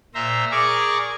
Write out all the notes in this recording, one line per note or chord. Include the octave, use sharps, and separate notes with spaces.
A#2 C5 E5 A#5
G#4 A#4 D5 C#6 D6